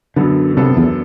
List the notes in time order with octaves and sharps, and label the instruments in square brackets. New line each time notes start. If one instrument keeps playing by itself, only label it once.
[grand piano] F#2 F#3 B3 D4 A4 [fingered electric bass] D3
[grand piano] F#2 F#3 B3 D4 A4 [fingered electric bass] C3
[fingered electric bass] E2